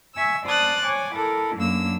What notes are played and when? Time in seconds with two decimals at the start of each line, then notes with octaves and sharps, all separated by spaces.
0.15 E5 G#5 C#6 E6
0.45 C5 D5 A5 D#6 F#6 A6
0.85 C#5 G#5 D6
1.14 E4 A4 A#4
1.55 F#2 A#3 D4 E6